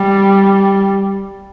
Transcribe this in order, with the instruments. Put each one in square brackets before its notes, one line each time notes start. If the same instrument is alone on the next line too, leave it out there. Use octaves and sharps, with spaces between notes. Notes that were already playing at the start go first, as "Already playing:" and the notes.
Already playing: [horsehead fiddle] G3